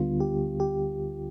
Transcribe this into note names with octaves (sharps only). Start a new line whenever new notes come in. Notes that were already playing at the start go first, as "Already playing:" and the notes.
Already playing: D2 D3 G3 B3 F4
G4
G4